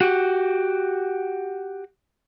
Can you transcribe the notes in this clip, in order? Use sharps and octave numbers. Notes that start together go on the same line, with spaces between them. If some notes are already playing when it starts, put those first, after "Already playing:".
F#4 G4